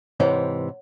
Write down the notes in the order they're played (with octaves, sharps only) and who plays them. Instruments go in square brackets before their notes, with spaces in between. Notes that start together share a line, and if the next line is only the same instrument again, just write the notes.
[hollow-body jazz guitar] G#2 C3 E3 [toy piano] C#5 F#5